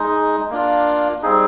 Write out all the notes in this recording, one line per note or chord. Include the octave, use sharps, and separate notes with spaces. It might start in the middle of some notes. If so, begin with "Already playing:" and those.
Already playing: G#3 D#4
A#3 D4 F4
G3 C4 D#4 G#4